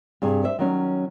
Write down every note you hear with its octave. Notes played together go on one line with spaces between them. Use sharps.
G2 C3 G#4
C5 E5
D#3 F#3 C#4